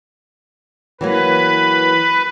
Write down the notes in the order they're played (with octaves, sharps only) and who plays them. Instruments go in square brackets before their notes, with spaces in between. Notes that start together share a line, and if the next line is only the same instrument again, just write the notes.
[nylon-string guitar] E3 F#3 A#3 [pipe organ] B4